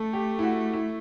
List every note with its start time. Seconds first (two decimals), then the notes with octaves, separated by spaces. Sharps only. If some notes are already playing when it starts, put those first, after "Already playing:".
Already playing: A3 A4
0.13 G4
0.39 E4
0.43 F#4
0.74 E4